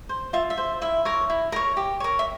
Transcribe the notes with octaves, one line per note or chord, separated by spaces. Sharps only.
C5
F4 E5
E5
C5
E4 E5
A#4 C#5
E4
A#4 C#5
G4
A#4 C#5
E5